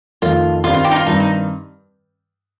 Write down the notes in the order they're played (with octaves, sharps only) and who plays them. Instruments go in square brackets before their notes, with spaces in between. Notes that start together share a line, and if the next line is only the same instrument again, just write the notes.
[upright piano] F2 D#3 A3 [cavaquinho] F4
[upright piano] G2 D#3 G3 C4 [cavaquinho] F4
[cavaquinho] F4
G4
D#4
F4
[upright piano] G2 D#3 G3 C4 [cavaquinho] D#4
[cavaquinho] D#4